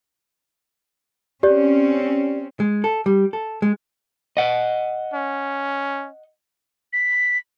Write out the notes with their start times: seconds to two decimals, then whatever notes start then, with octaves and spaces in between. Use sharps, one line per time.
1.43 C4 C#4 G4 D5
2.60 G#3
2.84 A4
3.06 G3
3.33 A4
3.62 G#3
4.37 D#5 F#5
5.14 C#4
6.93 B6